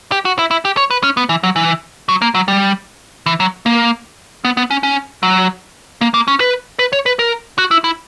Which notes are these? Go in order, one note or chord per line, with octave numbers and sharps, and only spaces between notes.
G4
F#4
E4
E4
G4
C#5
B4
C#4
B3
E3
F#3
E3
F#3
A#3
F#3
G3
E3
F#3
A#3
B3
B3
C#4
C#4
F#3
A#3
A#3
C#4
B4
B4
C#5
B4
A#4
F#4
E4
E4